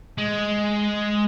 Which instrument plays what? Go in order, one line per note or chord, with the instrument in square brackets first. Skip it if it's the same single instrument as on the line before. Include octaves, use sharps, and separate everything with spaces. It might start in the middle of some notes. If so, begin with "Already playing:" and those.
[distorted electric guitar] G#3